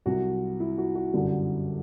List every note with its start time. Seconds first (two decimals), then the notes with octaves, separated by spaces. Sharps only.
0.06 C2 C3 F#3 F#4
0.60 E4
0.78 F#4
0.95 F#4
1.14 G1 F#2 D3 G3